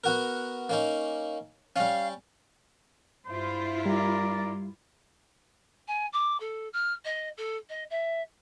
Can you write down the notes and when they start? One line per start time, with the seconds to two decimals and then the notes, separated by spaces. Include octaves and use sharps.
0.04 B3 F#4 A#4
0.69 A#3 C#4 D#4
1.76 G3 C#4 F5
3.28 G2 E4 F4 C5
3.86 G3 A#4 D5
5.88 G#5
6.13 D6
6.40 A4
6.73 F6
7.05 D#5
7.37 A4
7.69 D#5
7.90 E5